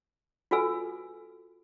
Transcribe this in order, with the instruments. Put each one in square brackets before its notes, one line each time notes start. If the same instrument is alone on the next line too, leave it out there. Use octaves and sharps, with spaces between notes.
[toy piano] F4 F#4 A4 B4 G#5 E6